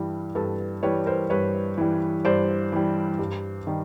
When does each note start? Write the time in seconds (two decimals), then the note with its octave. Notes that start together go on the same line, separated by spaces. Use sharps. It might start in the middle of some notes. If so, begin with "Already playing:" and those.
Already playing: G2 E3 G3
0.35 G2 A4 B4
0.83 E3 G3 B4 C#5
1.06 A#4 C5
1.30 G2 B4 C#5
1.78 E3 G3
2.25 G2 C5 D5
2.72 E3 G3
3.19 G2
3.67 D#3 G3